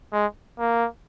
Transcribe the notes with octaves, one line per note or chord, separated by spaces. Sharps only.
G#3
A#3